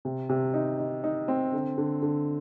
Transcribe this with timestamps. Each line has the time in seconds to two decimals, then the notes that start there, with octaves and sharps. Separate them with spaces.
0.05 C3
0.29 C3
0.54 D#4
0.79 D#4
1.04 D#4
1.28 C4
1.53 D3
1.78 D3
2.02 D3